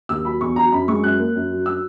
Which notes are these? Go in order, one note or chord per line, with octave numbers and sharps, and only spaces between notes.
D#2 E6
F#3 B5
E2 C#6
F#3 A#5
F#2 B5
G#3 C#6
F#2 F#6
A#3
F#2
F#3
E6